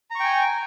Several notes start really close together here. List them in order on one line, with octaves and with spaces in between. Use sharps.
A#5 C#6 G5 G#5